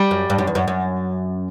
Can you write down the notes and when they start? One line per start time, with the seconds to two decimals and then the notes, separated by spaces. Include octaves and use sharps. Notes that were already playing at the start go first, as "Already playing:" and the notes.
Already playing: G3
0.11 F#2
0.30 G2
0.39 F#2
0.47 E2
0.55 F#2
0.68 F#2